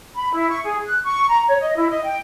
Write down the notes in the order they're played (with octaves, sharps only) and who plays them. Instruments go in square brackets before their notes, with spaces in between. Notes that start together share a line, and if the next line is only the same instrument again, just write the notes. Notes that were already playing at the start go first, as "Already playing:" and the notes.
[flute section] B5
E4
C#6
G#4
F#6
C#6
A#5
C#5
D#5
E4
D#5
G5